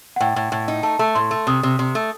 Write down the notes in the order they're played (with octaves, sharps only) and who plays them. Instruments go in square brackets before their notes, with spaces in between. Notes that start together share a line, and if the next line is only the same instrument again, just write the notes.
[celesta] F#5
[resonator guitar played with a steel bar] A2 [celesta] G5
[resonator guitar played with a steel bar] A2
A2
D#4
[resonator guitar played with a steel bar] A3 [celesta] A5
[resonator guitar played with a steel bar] A3 [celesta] A5
[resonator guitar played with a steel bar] A2 [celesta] C6
[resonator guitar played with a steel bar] A3
[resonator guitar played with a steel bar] C3 [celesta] D#6
[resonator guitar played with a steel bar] C3
C3
A3